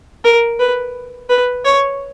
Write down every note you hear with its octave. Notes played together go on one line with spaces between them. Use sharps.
A#4
B4
B4
C#5